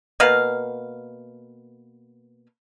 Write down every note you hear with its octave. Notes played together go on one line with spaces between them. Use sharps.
B2 A#3 B4 F5